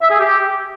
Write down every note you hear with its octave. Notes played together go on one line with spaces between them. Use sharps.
E5
G#4
G4